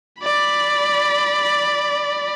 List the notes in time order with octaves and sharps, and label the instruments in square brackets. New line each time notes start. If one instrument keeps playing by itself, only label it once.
[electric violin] D5 B5